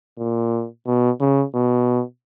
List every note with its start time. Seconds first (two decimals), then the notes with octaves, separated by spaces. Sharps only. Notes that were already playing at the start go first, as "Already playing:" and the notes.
0.19 A#2
0.86 B2
1.20 C#3
1.55 B2